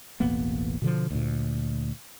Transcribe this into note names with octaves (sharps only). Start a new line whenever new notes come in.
E1 A1 A#3 B3
B2 D3 F3
D2 A#2